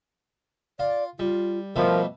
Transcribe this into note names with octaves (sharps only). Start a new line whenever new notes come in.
F4 D5
G3 F4
B2 F3 G3 A3 A#4